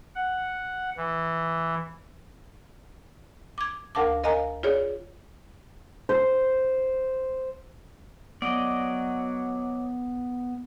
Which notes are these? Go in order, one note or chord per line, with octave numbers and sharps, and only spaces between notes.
F#5
E3
D6 G#6
D2 A#4 F5 A5 D6
A#4 D#5 F5 G#5 A#5
F4 G#4 C#5 D5
C5
F#3 B3 D5 D#5